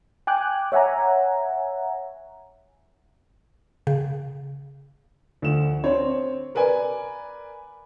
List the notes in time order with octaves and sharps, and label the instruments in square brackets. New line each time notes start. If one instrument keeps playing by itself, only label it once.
[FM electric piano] G5 G#5 D6 F#6
C#5 E5 F#5 G#5 A#5
[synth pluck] C#3
[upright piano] D2 F3 E7
C4 D4 C#5
A#4 B4 D5 G#5